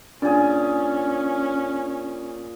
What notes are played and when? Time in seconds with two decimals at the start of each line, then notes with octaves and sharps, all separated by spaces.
0.22 A#2 C#4 D4 G#4